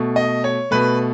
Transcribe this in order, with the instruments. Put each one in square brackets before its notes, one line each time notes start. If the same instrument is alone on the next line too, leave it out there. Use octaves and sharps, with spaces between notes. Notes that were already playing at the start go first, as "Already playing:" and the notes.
Already playing: [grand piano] B2 A3
D#5
C#5
B2 A3 B4